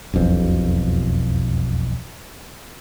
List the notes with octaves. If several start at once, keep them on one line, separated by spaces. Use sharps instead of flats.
E1 B1 F2